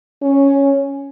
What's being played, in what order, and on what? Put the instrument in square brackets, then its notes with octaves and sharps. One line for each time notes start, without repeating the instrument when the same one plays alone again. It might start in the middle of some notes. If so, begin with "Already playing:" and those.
[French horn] C#4